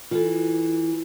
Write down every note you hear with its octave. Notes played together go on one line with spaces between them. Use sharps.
E3 F4 A4